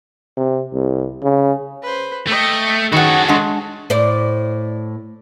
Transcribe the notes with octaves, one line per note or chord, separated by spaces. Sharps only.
C3
C2
C#3
B4 C5
A3 D#5 G5
D#3 F#3 C#4 F#4 G#4 A4 B4 F#5
G#3 D4 F#5 C#6
A2 C5 D5